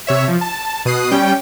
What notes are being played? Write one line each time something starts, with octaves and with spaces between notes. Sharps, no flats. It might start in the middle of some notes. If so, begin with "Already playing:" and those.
C3 C#5 E5
F3
A5
B2 D#6 F#6 C7
G3 C#4 G5